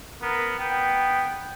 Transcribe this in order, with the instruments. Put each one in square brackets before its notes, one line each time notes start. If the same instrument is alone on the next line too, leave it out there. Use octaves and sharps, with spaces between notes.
[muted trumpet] B3 [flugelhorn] A#4
[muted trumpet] B3 [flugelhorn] G5